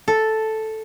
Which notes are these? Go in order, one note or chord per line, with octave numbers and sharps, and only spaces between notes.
A4